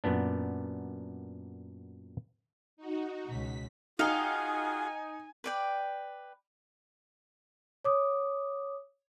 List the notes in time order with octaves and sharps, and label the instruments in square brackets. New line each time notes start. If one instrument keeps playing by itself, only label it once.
[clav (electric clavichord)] F#2 A#2 B3 D4
[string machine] D#4 F#4
[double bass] C#2 B2 [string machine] B6
[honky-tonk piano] D#4 [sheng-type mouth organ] F4 F#4 G#4 [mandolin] F5 G5 [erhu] G#5
[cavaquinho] B4 D5 G5
[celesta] C#5 D6 D#6